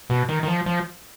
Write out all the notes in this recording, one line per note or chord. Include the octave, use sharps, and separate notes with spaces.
B2
D#3
D#3
F3
F3